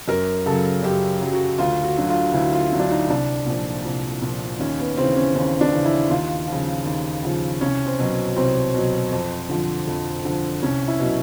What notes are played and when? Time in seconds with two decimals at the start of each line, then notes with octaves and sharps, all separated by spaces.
0.08 F#2 A#4
0.46 C#3 F#3 A4
0.83 F#2 G4
1.21 C#3 F#3
1.33 F#4
1.59 D2 F4
1.84 F#4
1.97 D3 F#3
2.09 F4
2.34 D2 E4
2.53 F4
2.72 D3 F#3
2.80 D4
2.91 D#4
3.09 C2 D4
3.46 A#2 F3
3.85 C2
4.22 A#2 F3
4.59 D#2 C#4
4.79 B3
4.97 C#3 E3 C4
5.17 C#4
5.35 D#2 C#4
5.61 D4
5.73 C#3 E3
5.85 E4
6.10 D#2 F4
6.48 C#3 F3
6.85 D#2
7.23 C#3 F3
7.61 C2 C#4
7.86 C4
7.98 B2 F#3
8.36 C2 C4
8.74 B2 F#3
9.11 F2
9.49 D3 F3
9.87 F2
10.25 D3 F3
10.63 C2 C#4
10.88 E4
10.99 B2 F#3